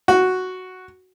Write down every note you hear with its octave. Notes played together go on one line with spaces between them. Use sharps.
F#4